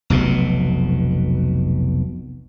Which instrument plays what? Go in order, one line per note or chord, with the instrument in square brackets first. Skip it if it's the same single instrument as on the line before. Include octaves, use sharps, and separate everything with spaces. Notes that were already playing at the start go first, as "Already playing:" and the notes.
[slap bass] F1 B1 B2